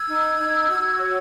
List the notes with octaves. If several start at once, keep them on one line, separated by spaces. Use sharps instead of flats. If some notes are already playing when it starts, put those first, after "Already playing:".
Already playing: E6 G#6
D#4
D#4
F#4
C#5